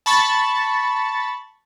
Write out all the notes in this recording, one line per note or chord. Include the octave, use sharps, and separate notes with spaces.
A5 B5 C#6 A6